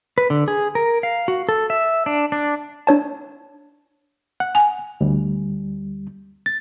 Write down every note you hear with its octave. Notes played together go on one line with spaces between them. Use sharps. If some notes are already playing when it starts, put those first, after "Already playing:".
B4
D3
G#4
A#4
F5
F#4
A4
E5
D4
D4
D4 C#5 A5
F#5
G#5
D2 G3
A6